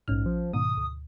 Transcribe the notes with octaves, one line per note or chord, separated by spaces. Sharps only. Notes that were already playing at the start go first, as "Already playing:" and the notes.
A#1 G#2 C#4 F6
F3
G#2 B2 D#3 D#6
D2